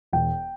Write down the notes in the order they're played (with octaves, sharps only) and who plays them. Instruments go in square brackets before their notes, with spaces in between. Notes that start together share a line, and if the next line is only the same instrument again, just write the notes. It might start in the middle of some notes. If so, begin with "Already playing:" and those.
[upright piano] E1 G5